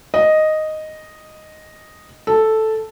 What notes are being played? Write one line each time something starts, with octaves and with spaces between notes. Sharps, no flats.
D#5
A4